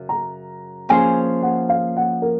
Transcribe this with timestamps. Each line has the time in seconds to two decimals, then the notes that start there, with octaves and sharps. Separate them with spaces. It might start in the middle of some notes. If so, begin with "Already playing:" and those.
Already playing: F#2 C#3 F#3
0.09 A#5
0.89 F3 A#3 C#4 G#4 C5 G#5
1.42 F#5
1.69 F5
1.97 F#5
2.22 A#4